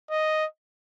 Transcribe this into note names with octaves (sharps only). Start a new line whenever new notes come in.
D#5